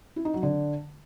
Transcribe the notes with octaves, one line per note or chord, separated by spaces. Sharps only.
E4
D#4
F#3
D3